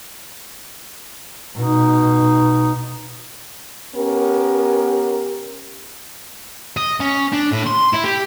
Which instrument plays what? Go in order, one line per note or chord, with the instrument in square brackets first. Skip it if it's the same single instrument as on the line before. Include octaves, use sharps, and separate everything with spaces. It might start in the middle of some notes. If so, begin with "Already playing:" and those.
[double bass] B2 D#4
[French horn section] B3 C#4 G4 A#4
[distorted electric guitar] D#5
C#4
D4
A2
C6
E4
G4